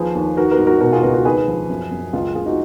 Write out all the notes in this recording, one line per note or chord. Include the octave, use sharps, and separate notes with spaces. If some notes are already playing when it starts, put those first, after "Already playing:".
Already playing: D#2 F3 G#4 B4
D#2
D#3 F#4 A#4
F#4 A#4
G#2
F#4 A#4
B2 F#4 A#4
F4 G#4
C#2 F#4 A#4
F#4 A#4
D#2 G#4 B4
F3
F#2
F#2
C#2 F4 G#4
C#2 F4 G#4
D#4 F#4